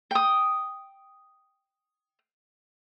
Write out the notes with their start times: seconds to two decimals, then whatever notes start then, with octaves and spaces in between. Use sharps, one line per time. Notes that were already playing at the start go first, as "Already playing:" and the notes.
0.11 G5 D#6